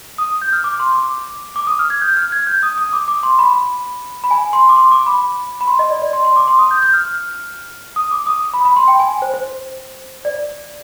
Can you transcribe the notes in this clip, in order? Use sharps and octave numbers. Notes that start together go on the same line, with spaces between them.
D#6
G6
F6
D6
C6
D6
D6
D#6
F6
G#6
G6
F6
G#6
G6
D#6
D#6
D6
D6
C6
B5
B5
G#5
C6
D6
C6
D6
B5
B5
C6
D#5
D5
D5
C6
C6
D6
C6
D#6
G6
G6
F6
D#6
D6
D#6
B5
B5
C6
G5
G#5
C5
C5
D5